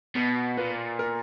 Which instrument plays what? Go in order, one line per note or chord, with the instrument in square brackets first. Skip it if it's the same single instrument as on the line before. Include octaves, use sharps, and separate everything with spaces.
[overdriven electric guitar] B2
[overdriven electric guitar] A#2 [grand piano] B4
[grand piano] A#4